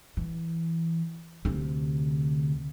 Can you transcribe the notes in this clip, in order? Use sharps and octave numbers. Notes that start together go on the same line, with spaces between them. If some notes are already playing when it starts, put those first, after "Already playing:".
E3
D2 C3